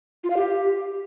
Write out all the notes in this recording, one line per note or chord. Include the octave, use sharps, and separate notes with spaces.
F4
F5
G4